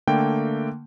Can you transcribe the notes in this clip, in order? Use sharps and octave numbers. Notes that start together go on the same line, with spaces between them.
D3 A3 A#3 G5